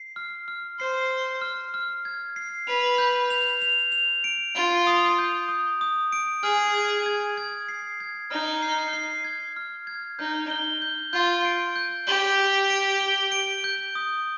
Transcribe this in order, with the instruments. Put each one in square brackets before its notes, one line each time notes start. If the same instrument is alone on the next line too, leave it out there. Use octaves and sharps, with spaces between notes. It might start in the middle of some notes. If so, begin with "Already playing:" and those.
Already playing: [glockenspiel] C7
F6
F6
[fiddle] C5 [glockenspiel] C7
[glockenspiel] F6
F6
F6
G#6
C7
[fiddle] B4 [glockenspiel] F7
[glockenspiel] G6
F7
F7
F7
D7
[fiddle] F4 [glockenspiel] D7
[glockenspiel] D#6
G6
D#6
D#6
D7
[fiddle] G#4 [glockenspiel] F6
[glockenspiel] G#6
G#6
G#6
C7
G#6
[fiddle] D#4 [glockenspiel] F6
[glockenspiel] C7
C7
G#6
F6
G#6
[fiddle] D#4 [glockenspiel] G6
[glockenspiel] G7
G6
[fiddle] F4 [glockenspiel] G6
[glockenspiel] D7
G6
[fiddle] G4 [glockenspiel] G6
[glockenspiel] G6
D7
G7
D7
G6
D#6